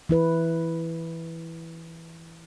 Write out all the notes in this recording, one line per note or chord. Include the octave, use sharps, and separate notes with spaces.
E3 E4 B4